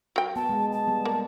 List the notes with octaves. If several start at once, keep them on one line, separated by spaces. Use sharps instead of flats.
F#3 G5
B3 A5
G#3
A5
G3 B3
A#3